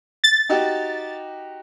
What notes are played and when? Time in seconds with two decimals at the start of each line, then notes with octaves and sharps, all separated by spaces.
0.24 A6
0.49 D#4 F#4 G4